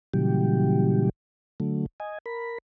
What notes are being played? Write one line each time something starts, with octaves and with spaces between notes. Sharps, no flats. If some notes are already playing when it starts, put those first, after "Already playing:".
A#2 C#3 E3 F#3 G3 G4
D3 F#3 A3
D#5 G#5
A#4 B5